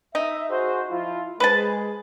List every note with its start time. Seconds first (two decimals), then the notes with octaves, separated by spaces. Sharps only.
0.15 D#4 E5
0.49 F#4 G#4 C5
0.90 F3 E4 F4
1.40 G#3 G#4 B4 C5 A5